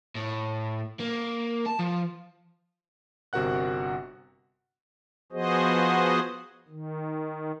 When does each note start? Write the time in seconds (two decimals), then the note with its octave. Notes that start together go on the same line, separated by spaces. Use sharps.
0.15 A2
1.00 A#3
1.66 A5
1.79 F3
3.33 G1 C3 F#4 A#4 F#5 F#6
5.32 F3 B3 F#4 G#4 C5 D#5
6.68 D#3